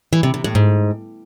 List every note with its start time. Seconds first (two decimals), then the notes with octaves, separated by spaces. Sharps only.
0.13 E3
0.23 C3
0.34 C3
0.44 A2
0.55 G#2